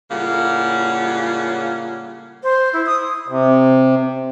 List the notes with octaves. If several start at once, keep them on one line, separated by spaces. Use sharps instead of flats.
A2 C#3 G3 A#3 F4 F#5
C5
E4
D#6
C3